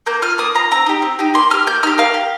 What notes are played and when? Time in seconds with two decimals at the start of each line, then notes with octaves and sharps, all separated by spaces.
0.06 A#3 G6
0.22 F4 F6
0.38 A#3 D#6
0.55 F4 A#5
0.71 C4 A#5
0.86 D#4 G4
1.02 C4
1.19 D#4 G4
1.34 A#3 C6
1.50 D#4 G4 F6
1.67 A#3 G6
1.83 D#4 G4 F6
1.98 A#3 F5
2.14 G4